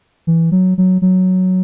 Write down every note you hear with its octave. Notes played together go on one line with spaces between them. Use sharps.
E3
F#3
F#3
F#3